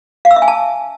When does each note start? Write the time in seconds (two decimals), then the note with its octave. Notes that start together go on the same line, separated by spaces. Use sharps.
0.25 F5
0.31 E6
0.36 E5
0.42 G#5
0.48 A5